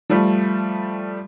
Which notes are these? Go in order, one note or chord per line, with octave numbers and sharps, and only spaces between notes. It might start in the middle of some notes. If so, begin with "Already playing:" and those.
F3 G3 A3